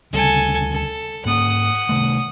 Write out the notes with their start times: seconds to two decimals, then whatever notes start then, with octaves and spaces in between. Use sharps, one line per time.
0.13 D2 C#3 G3 A4 G#5
0.71 A4
1.25 G#2 A#3 C#4 F#5 D#6
1.89 C3 D#3 A3